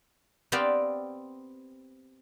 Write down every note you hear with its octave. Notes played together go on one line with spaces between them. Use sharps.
B3 C4 G4 D5 F5 G5